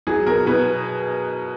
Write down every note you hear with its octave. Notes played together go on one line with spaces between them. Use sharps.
F#3 G#4
B2 A#4
B2 B4